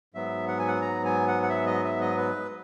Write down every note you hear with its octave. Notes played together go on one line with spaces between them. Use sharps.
G#2 F#3 B3 E5
F#5
G#5
F#5
A#5
G#5
F#5
F#5
E5
D#5
E5
D#5
B4